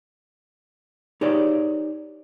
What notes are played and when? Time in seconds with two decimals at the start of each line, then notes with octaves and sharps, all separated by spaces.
1.21 D#4 G4 G#4 B4 C#5 D5